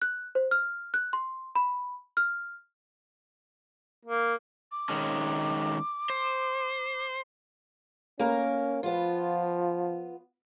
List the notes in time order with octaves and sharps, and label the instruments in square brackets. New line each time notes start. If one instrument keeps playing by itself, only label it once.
[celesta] F#6
C5
F6
F#6
C6
B5
F6
[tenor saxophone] A#3
[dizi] D6
[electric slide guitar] D#3 G#3 C#4
C5
[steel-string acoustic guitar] A#3 A#4 [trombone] C#4
[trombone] F3 [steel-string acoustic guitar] B3 F4